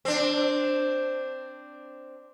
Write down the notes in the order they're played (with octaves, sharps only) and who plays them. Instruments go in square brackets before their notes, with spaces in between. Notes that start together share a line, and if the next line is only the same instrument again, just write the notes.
[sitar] C4 D4